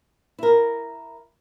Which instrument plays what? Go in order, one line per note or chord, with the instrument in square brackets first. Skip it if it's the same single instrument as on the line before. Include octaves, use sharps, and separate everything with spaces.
[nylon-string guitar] E4 A#4